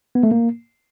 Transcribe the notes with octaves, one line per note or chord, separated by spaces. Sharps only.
B3
A3
A#3